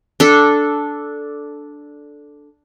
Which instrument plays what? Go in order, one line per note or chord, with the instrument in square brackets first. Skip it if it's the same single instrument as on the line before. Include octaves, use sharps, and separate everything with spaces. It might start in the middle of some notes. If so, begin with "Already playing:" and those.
[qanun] D4 A4